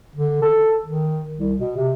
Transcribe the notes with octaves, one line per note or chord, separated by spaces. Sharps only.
D3
A4
D#3
C2
B2
C3